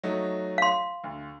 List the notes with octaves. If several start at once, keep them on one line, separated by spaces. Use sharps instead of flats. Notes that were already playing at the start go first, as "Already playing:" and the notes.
F#3 A3 D#4
F5 C6
D2